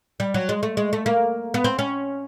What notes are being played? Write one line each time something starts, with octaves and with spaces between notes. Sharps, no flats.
G3
F#3
G#3
A3
G#3
A3
A#3
B3
C4
C#4